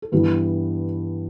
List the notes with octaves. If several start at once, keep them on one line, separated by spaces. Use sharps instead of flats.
A4
G2 E3 G3 B3 E4 B4